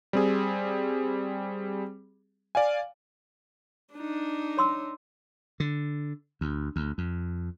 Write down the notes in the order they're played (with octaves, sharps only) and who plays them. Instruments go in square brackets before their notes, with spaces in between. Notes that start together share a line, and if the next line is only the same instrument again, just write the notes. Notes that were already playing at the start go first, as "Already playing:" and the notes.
[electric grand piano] G3 C4 G#4
D5 F5 G#5
[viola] D4 D#4
[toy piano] C#5 C6 E6
[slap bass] D3
D2
D2
F2